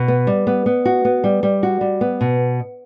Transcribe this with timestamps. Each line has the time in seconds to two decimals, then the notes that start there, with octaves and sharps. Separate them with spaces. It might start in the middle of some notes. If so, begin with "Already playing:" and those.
Already playing: B2
0.08 B3
0.27 G3
0.47 B3
0.66 B3
0.85 F#4
1.05 B3
1.24 G3
1.43 G3
1.63 F#4
1.81 G3
2.01 B3
2.21 B2